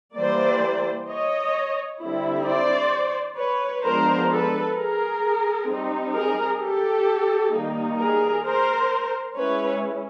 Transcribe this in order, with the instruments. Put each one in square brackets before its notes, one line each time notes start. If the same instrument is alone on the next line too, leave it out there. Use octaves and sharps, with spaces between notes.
[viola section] E3 G3 A#3 C5 D5
C#5 D#5
D3 G3 C4 E4
C5 D5
B4 C#5
F3 G#3 B3 D4 A#4 C5
A4 B4
G#4 A#4
G3 C4 D#4
G#4 A#4
G4 A4
D#3 G3 A#3 D#4
G#4 A#4
A#4 C5
G#3 C#4 E4 B4 C#5